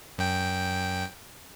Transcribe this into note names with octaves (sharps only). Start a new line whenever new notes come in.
F#2 G5